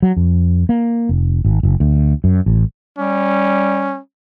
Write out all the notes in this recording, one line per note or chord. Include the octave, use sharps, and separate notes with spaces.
F#3
F2
A#3
F1
G#1
F#1
D2
F#2
A1
G3 C#4